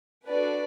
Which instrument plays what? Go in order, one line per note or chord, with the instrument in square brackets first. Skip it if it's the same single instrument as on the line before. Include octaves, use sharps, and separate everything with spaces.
[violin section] D4 F#4 A4 B4 D5